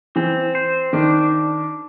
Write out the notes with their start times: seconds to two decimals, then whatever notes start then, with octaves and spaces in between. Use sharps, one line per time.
0.16 E3 C4
0.55 C5
0.93 D#3 D4